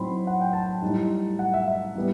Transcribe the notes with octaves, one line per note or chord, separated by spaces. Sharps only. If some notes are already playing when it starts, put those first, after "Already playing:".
Already playing: A2 F#3 C4 D#4 B5 C6
F#5
G5
A5
A2 G3 D#4
F#5
E5
E5
A2 G3 B3